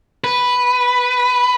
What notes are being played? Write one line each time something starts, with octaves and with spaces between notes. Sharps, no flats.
B4